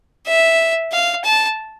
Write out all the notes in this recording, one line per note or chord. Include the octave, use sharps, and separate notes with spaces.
E5
F5
A5